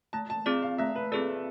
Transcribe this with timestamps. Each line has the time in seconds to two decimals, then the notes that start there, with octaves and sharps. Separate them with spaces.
0.13 A3 A5
0.30 A5
0.46 C4 F4 G#4 D5
0.62 F5
0.78 A3 E5
0.96 B4
1.12 C4 F4 G#4 A4 D5